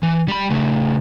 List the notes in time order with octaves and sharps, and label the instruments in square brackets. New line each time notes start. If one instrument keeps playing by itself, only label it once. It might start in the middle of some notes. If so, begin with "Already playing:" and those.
[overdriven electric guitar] E3
G3 B5
C#3 A3